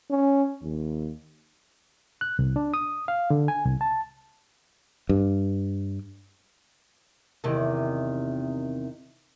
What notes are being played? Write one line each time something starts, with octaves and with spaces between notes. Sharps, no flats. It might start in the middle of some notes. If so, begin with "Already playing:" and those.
C#4
D#2
F#6
C2
D4
D#6
F5
D3
G#5
C2
A5
G2
E2 C3 D#3